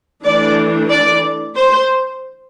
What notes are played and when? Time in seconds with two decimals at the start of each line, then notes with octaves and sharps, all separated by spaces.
0.24 E3 A3 D4 D5
0.90 D5
1.56 C5